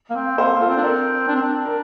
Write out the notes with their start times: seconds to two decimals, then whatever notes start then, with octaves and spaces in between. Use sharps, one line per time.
0.10 A#3
0.15 C4
0.38 A#3 A4 C5
0.53 A#3
0.60 F4 A4
0.68 C4
0.77 D4
0.83 C4 A#4 D5
1.28 D4
1.36 C4
1.43 D4
1.65 A#4